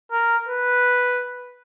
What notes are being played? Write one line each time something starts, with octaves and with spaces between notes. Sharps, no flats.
A#4
B4